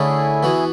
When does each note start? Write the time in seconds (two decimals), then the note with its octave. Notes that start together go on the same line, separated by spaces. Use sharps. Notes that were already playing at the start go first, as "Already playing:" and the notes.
Already playing: D3 A3 C#4 E4 G#4
0.43 E3 B3 F#4